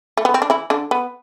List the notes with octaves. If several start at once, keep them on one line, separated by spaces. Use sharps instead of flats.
A3
B3
C4
D4
E3 E4
D3 D4
B3